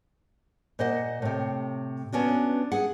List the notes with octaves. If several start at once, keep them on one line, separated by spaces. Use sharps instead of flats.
A#2 C5 D#5 F#5
A2 C3
B3 C#4 D4 F#4
G#4 F#5